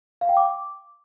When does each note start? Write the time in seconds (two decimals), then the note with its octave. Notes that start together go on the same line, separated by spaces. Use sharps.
0.21 F5
0.29 G5
0.37 D6